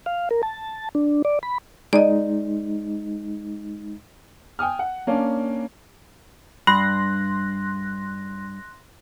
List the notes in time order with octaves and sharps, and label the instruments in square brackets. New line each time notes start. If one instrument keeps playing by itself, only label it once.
[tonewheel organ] F5
A#4
A5
D4
D5
B5
[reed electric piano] G#3 D#4 [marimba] D5 D#5
[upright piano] G5 G#5 D#6 F6
F#5
A#3 C#4 D4
[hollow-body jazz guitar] G2 [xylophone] B5 [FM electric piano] C6 F#6 A#6